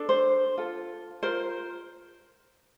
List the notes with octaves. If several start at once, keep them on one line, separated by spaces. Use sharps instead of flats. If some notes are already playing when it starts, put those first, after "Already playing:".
Already playing: D4 A4
C5
F4 A4
F4 A#4 C5